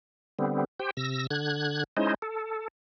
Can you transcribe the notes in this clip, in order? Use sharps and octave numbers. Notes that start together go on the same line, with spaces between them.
D3 G3 B3 C4
G4 C5 G5
C3 E6 A#6
D3 F#6 G#6
G#3 C#4 D#4 E4 C5 D#5
A4